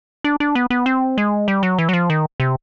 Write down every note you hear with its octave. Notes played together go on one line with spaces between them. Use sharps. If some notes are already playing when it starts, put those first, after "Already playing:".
D4
D4
B3
B3
C4
G#3
G3
F#3
E3
F#3
F3
D#3
C3